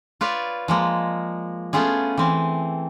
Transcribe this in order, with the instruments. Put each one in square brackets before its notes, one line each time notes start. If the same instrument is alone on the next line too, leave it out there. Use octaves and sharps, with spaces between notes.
[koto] F4 B4 C#5 D5
F3 G#3 A#3
A3 B3 C#4 F4 G#4
E3 C4